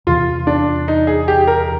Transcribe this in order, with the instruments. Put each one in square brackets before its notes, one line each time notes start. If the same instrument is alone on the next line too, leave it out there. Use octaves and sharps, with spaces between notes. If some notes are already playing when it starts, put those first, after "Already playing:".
[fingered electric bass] E2 C3 E3 [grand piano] F4
[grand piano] D4
D#4
G#4
G4
A#4